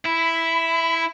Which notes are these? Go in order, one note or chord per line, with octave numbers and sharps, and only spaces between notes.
E4 B5